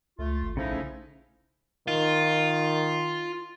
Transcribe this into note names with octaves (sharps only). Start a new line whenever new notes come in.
C#2 A3 F4
G#1
A#1 C#3 F3 A3 C#4 D#4 E4
D#3 F4